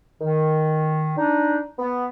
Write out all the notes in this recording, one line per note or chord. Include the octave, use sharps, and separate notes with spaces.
D#3
D4 D#4
B3